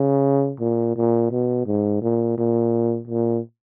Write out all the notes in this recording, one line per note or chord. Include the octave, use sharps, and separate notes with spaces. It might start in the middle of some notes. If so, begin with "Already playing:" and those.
Already playing: C#3
A#2
A#2
B2
G#2
A#2
A#2
A#2